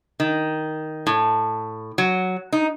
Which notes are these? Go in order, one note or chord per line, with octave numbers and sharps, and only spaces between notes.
D#3
A2
F#3
D#4